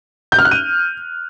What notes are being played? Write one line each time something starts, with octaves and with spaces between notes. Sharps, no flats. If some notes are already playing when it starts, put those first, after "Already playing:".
G6
F6
F#6
D#7